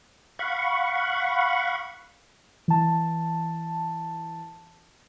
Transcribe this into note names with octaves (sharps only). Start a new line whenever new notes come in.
F5 F#5 B5 C#6
E3 A5